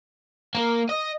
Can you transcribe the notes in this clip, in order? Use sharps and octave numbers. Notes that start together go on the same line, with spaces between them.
A#3
D#5